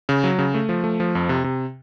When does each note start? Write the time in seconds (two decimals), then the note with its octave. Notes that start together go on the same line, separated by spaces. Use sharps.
0.09 C#3
0.24 F#3
0.39 C#3
0.54 A3
0.69 F3
0.84 A3
1.00 F3
1.15 F2
1.29 C3
1.44 C3